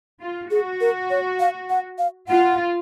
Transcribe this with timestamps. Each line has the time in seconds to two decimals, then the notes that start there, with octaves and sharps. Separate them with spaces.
0.21 F4
0.51 F#4 G#4
0.81 A#4
1.10 C#5
1.40 F5
1.70 F#5
1.98 F5
2.29 F4 F#5